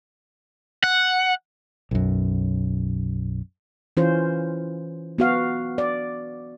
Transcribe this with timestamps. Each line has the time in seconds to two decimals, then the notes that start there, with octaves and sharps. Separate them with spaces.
0.84 F#5
1.91 B1 F#2
3.97 E3 C#4 F4 C5
5.18 B3 F#4 F5
5.78 D5